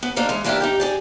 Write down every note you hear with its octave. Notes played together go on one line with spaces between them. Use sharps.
B3
A#3 D4 D#4 A#4 C5
E3 G#3
E3 A#3 D4 E4 G4 A#4
D#4 G4 G5
G4 G#4 D5